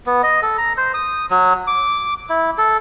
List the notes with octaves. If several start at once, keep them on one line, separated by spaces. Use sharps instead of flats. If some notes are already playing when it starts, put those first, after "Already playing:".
B3
D#5
A4
A#5
C5
D#6
F#3
D6
E4
A4